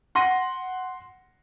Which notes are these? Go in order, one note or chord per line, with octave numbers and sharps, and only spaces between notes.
F#5 C6 A#6 D#7